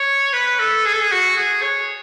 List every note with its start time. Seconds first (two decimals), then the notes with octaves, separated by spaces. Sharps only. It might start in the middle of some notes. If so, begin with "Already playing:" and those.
Already playing: C#5
0.33 B4
0.59 A4
0.86 G#4
0.93 A4
1.01 G#4
1.12 F#4
1.36 G#4
1.62 C#5